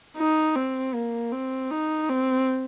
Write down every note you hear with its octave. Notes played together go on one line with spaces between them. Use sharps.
D#4
C4
A#3
C4
D#4
C4